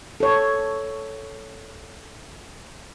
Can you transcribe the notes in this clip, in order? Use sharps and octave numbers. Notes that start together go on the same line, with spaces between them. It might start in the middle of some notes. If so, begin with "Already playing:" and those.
A4 C#5